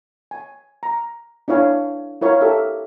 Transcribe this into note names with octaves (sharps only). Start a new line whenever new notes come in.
G#5
A#5
D4 E4 C#5 F5 G#5
E4 A#4 C#5 F5
G4 A4 A#4 D#5 E5